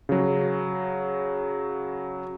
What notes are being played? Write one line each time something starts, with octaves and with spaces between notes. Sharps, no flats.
C#3 F#3